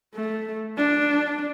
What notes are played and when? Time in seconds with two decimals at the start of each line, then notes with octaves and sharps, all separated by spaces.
0.15 A3
0.77 D4